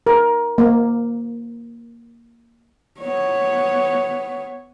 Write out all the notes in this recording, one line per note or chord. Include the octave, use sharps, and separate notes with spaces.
A#4
A#3
B3 C#5